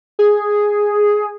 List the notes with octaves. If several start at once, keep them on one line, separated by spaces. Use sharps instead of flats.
G#4